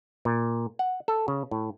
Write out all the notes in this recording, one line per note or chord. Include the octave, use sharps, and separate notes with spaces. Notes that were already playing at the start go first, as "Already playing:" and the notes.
A#2
F#5
A4
C#3
A2